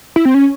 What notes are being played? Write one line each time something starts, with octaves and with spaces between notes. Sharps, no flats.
E4
C4
C#4